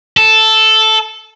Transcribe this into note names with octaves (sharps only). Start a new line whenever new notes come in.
A4